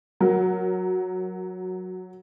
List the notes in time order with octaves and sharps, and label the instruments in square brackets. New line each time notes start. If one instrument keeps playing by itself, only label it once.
[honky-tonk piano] F#3 A#4